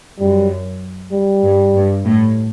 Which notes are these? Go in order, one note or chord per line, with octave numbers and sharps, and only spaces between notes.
F#2 G3
G3
G2
G2
A2